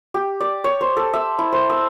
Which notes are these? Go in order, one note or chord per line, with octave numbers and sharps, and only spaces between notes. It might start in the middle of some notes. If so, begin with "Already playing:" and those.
G4
D5
C#5
C5
A4
E5
E4
C5
E6